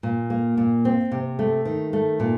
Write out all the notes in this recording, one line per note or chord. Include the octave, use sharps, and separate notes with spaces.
A#2
A#3
A#2
C4
C3
A3
D#3
A3
A#2